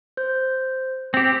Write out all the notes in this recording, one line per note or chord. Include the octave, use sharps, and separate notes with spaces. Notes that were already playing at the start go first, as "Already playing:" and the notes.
C5 G6
C4 G4